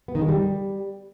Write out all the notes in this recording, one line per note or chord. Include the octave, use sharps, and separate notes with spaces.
B3
D#3
G#3
G3